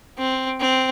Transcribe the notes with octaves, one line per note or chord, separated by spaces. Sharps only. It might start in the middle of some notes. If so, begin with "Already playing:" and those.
C4
C4